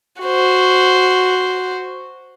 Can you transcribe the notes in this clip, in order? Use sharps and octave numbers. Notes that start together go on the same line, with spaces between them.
F#4 C5